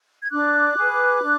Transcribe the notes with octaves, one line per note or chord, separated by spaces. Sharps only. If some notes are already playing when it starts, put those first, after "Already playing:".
G#6
D4 D6 F#6
G#4 B4
D4